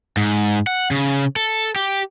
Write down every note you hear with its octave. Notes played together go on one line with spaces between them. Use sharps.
G#2
F#5
C#3
A4
G4